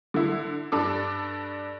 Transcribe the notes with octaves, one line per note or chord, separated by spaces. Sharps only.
D3 E4
G2 D4 A4 D6